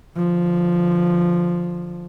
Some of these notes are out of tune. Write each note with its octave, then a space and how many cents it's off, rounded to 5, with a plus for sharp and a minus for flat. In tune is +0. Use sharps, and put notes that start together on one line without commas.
D3 +15 F3 +0